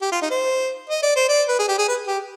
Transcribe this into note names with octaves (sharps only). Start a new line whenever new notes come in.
G4
F4
D#4
C5
D#5
D5
C5
D5
B4
G#4
G4
G#4
B4
G4